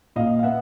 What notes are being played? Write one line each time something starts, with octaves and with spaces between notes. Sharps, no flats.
A#2 D#5 F5
F5
B3 E5 F#5